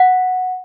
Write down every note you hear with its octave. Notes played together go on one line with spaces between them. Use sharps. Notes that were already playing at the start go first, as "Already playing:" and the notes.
Already playing: F#5